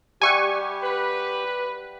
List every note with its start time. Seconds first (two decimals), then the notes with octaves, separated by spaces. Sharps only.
0.22 G3 G4 E5 F#5 G#5 C#6
0.83 B4